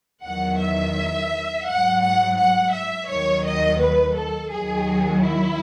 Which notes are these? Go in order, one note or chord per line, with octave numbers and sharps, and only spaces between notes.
E2 D#3 F#3 F#5
E5
G#2 F#3 F#5
F#5
F#5
E5
D#2 D#3 F#3 C#5
D#5
B4
A4
D#2 D#3 F#3 G#4
E4